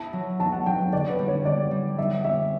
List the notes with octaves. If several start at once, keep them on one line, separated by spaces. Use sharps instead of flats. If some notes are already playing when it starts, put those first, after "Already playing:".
Already playing: E4 A5
F#3
F#3 A5
F#5
F#3 G5
D3 D5
B4
G3
C#5
D3 D5
G3
G3 E5
C#4 E5